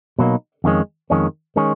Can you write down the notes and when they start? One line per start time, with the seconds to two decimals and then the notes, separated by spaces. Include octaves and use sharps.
0.19 B2 F#3 A#3 D#4
0.64 F2 D#3 G#3 C#4
1.10 F2 D#3 G#3 C#4
1.56 D#3 G#3 C#4